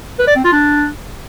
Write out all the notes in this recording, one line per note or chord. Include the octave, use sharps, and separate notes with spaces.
B4
D5
C4
F4
D4